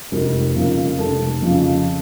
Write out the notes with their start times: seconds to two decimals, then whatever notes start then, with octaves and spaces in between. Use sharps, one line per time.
0.12 F1 A#4
0.56 F2 C#3 F3 A#4
0.99 F1 A4
1.42 F2 C#3 F3